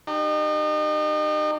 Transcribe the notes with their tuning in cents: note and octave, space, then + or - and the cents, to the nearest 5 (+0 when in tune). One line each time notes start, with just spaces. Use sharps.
D#4 -35 G4 +0